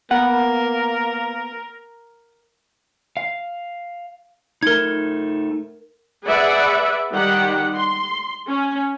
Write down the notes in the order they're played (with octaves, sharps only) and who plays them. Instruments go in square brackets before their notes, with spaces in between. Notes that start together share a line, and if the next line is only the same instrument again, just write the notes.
[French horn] A#3 [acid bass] B3 [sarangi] A#4 [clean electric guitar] F#5
[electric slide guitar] F5
[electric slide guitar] A3 D#4 [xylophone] A#4 G#6
[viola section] G#4 B4 D5 E5 F#5
D#3 G3 G4 F#5
C6
C#4